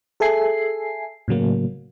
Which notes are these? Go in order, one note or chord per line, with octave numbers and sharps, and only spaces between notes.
G#4 A4 E5 G#5 C7
A2 C#3 F#3 A#3